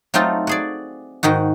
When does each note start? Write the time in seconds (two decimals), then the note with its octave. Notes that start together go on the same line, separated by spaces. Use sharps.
0.14 F#3 A3 C4 D#4 F4 A4
0.47 F#4 G#4 D5
1.23 G#2 D#3 D#4 F#4